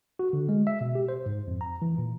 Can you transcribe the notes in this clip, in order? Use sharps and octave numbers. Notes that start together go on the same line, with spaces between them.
F#4
D3
G#3
E5
B2
G4
C5
G#2
F2
A#5
E3
A#2